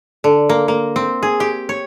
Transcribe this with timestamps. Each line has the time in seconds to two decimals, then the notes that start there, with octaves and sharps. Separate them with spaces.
0.24 D3
0.49 A#3
0.68 A#3
0.96 C4
1.23 G#4
1.40 G4
1.69 C#5